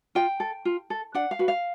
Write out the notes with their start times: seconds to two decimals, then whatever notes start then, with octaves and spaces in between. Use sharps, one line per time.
0.15 F4 G5
0.40 A4
0.65 F4
0.90 A4
1.14 D4 F#5
1.31 F5
1.39 F#4 B4
1.48 F5